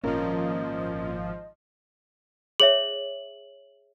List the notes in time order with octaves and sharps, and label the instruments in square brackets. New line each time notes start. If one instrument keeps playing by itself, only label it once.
[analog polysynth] G#1 F3 [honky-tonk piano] A#2 [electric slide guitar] C#4 A#4 [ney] D#5
[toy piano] G#4 C#5 E5 [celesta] F#7